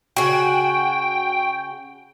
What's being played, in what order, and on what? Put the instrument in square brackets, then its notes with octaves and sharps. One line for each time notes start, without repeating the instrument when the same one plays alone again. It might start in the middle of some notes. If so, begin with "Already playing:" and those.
[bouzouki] C#3 F#4 [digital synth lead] G5